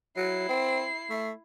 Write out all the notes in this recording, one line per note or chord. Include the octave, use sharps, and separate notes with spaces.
F#3 E4 C7
C4
A3